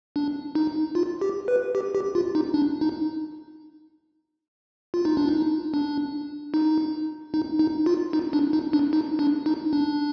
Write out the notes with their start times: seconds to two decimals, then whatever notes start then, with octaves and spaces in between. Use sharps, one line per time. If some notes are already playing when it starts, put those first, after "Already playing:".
0.16 D4
0.55 D#4
0.95 F4
1.21 G4
1.48 B4
1.75 G4
1.95 G4
2.15 F4
2.35 D#4
2.54 D4
2.81 D#4
4.94 F4
5.05 D#4
5.17 D4
5.28 D#4
5.74 D4
6.54 D#4
7.34 D#4
7.59 D#4
7.86 F4
8.13 D#4
8.33 D4
8.53 D#4
8.73 D4
8.93 D#4
9.19 D4
9.46 D#4
9.73 D4